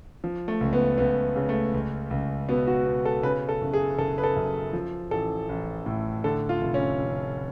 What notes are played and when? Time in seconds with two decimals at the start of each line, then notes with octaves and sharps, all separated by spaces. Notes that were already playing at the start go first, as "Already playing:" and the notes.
0.24 F3
0.48 A3
0.61 C#2
0.73 B3
0.98 C#2 B3
1.36 C#3
1.49 A3
1.74 C#2
2.11 C#2
2.49 B2 B3
2.67 F#4
2.86 B2
3.05 A4
3.23 C#3 B4
3.49 A4
3.61 F#1
3.73 G#4
3.98 F#1 A4
4.18 B4
4.23 A4
4.36 F#2
4.73 F3
5.11 A1 A4
5.49 A1
5.86 A2
6.24 D3 A4
6.49 F4
6.61 F1
6.74 C#4
6.99 F1